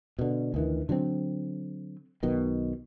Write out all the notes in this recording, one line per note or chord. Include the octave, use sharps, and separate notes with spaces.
B2 D3
D2 D#3 E3
D3 F#3 G3 C4
B1 B2 D#3